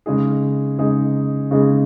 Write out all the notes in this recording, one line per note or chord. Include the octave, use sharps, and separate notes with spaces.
C#3 G#3 D#4 G#4
C#3 G#3 D#4 G#4
C#3 G#3 D#4 G#4